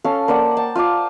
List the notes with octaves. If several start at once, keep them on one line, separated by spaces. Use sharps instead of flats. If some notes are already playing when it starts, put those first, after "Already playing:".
C#4 A4 F5
A#3 C5 D5 F#5
G5 A5
F4 C5 F5 D6